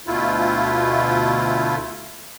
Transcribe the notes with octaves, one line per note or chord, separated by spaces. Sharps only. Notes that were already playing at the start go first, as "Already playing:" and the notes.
D2 B2 A3 E4 F4